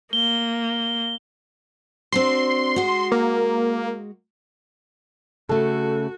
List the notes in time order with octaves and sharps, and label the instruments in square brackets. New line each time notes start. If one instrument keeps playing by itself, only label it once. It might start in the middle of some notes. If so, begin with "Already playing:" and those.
[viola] A#3 [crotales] G7
[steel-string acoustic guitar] C4 D4 F#4 [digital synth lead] C6
[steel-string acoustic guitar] G#3 F#4
[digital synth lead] A#3
[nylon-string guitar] C#3 A3 [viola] F#4 [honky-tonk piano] A4